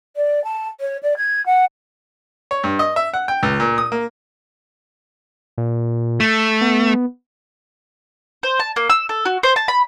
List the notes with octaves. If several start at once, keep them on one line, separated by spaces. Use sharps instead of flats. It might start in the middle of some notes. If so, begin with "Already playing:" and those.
D5
A5
C#5
D5
G#6
F#5
C#5
G2
D#5
E5
F#5
G5
C#2
A#2
D#6
A#3
A#2
A3
B3
C5
A5
A#3
E6
A4
F#4
C5
A5
B5